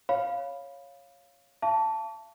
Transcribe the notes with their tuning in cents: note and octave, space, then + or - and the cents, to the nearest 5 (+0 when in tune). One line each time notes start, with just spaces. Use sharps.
C#5 +0 F5 +0 B5 +0
F5 -45 A5 +0 C#6 +45